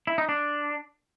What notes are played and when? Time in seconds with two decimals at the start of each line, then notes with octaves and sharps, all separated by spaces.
0.07 E4
0.18 D#4
0.29 D4